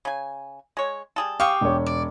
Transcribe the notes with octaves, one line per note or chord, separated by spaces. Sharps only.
C#3 G#5
G#3 C#5
G3 G#4 A4
G4 F5 C#6 D#6
E1 C#5
D5